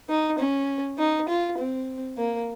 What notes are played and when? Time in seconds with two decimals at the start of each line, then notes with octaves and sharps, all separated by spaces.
0.09 D#4
0.38 C#4
0.99 D#4
1.28 F4
1.58 C4
2.17 A#3